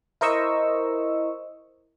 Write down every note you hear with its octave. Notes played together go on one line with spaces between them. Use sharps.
E4 A#4 C5 D#5 C#6 E6